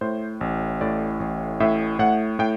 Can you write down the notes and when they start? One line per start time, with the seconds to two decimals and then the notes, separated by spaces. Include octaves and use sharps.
0.01 A2 C5
0.41 A1
0.81 A2 D5
1.20 A1
1.60 A2 E5
1.99 A2 F#5
2.39 A2 G5